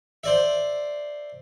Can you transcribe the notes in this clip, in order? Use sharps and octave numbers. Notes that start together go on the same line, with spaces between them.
C5 D5 E5